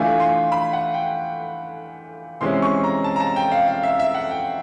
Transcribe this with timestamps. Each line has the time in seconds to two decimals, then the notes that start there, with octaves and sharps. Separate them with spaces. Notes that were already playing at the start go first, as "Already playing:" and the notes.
Already playing: E3 A3 D4 F4 G#5
0.20 C6
0.52 B5
0.73 F#5
0.94 G5
2.41 C3 E3 G#3 C#4 C6
2.62 C#6
2.84 A#5
3.04 A5
3.16 A#5
3.20 A5
3.36 G5
3.52 F5
3.68 F5
3.83 E5
4.00 E5
4.15 F#5
4.31 G5